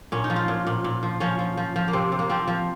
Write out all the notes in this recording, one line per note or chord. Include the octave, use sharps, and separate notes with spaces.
A#2 C#4
D#4
F3
F4
A#2
A#2
A#2
F3
F3 C#4
F3
F3
F3
A#3
C3 C4
C3
A#3
F3 C4
F3